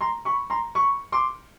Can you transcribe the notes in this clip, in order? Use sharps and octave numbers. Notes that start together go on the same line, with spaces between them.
A#5 C6
B5 C#6
A#5 C6
B5 C#6
C6 D6